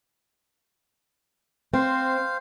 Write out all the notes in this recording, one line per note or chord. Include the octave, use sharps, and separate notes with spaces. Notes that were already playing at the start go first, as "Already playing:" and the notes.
C4 C5 F5